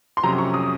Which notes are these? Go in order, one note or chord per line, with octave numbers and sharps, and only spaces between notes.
C6
F2 C3 F#3 C#4 A#5
C#6
D#6